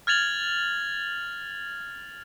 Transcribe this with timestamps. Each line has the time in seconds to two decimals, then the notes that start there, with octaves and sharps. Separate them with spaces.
0.07 F6 G#6 A6 F7 F#7